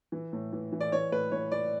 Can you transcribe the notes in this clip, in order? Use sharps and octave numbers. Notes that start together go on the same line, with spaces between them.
E3
A2
E3
E3
D5
E3 C#5
A2 B4
E3 C#5
E3 D5